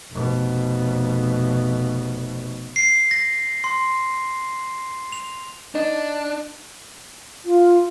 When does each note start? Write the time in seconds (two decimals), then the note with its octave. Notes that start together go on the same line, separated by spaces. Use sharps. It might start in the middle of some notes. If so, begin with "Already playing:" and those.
0.12 F1 B2
2.76 C7
3.11 A#6
3.64 C6
5.12 F7
5.75 D4 D#4
7.45 F4